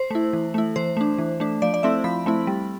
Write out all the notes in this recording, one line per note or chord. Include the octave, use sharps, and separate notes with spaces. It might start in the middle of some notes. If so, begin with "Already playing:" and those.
Already playing: C5
A3 E4
E3
A3 E4
E3 C5
A3 D4
E3
A3 D4
F3 D5
D5
A3 C4 E4 E5
F3 B5
A3 C4 E4
G3